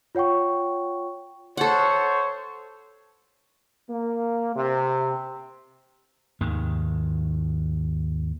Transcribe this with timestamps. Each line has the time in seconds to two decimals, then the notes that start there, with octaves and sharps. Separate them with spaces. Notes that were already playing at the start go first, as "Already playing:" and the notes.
0.15 F4 C#5 F#5 G5 C#6
1.57 A4 C5 C#5 F#5
3.90 A#3
4.56 C3
6.41 D#2 G#2 D#3